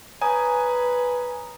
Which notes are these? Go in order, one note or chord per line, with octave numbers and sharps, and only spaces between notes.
B4 C#5 G#5 A#5 D#6